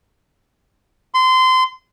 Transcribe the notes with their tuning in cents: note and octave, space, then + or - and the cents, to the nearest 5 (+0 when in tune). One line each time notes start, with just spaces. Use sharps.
C6 -25